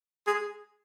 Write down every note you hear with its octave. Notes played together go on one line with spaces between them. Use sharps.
G#4